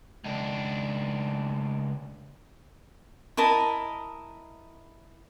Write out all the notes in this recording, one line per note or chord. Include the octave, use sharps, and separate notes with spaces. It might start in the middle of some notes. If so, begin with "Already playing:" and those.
C#2 D4
E4 A#4 D#5 A5